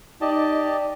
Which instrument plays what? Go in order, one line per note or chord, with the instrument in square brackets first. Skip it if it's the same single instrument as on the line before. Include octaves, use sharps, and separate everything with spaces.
[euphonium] D#4 [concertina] G4 D#5 A5 [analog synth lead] D5